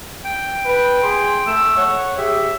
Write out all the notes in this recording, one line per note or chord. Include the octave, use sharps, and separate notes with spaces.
G5
B4
G#4 C6
A3 E6
C#5 F#5
G4 G#4 E5